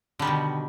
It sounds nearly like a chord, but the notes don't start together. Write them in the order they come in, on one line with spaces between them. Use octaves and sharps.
D3 G3 D#3 B2